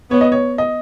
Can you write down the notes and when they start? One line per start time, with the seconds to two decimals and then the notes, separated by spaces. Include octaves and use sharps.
0.11 B3 C#5
0.21 D#5
0.32 C#5
0.58 D#5